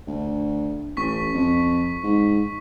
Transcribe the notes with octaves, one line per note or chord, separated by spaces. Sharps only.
D2
A1 C#6 B6
F2
G#2